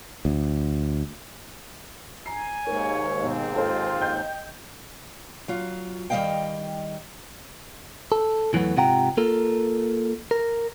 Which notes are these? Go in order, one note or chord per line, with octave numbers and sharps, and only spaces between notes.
D2
G#5 A#5 C7
D#2 G#2 A#4 C#5
B2 C4
F4 A4 C5
D#5 G5 G6
F#3 F4
D#3 G3 D4 D#5 F5 G5
A4
E2 E3 F#3 A3 B3
G#2 C3 F4 F#5 G5 A#5
A#3 F4 A4 A#4
A#4